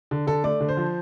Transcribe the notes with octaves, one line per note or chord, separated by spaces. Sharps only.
D3
D3 A4
A3 D5
D3
C5
F3